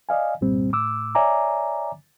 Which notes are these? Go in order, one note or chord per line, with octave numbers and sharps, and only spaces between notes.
D5 D#5 F5 G#5
C2 G2 A#2 G3 C4
A2 D6 E6
C#5 D5 E5 G#5 A#5 D6